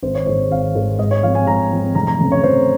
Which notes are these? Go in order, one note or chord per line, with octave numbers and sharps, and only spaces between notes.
G#1 C5
C#5
G#2 D#3 G#3 C5
G#1 F5
G#2 D#3 G#3
G#2 D#5
C#5
F3 C4 F5
G#5
G#2 A#5
F3 C4
F1 A#5
A#5
F2 C#3
C#5
F1 C5